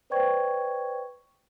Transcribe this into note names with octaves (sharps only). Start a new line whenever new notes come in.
B4 C5 D5 G5 C#6 G#6